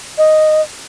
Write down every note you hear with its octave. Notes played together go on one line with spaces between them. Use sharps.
D#5